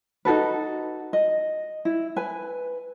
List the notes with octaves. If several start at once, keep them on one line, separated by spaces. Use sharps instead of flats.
D#4 F#4 A4 B4
D#5
E4
B4 G#5